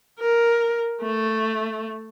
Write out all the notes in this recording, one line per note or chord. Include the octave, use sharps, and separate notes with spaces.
A#4
A3